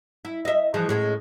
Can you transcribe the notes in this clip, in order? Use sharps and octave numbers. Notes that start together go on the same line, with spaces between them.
E4
D#5 E5
E3 F3 G#3
A2 G#3 C#4